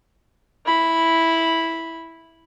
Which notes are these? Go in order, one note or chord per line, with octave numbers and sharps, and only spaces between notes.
E4 B5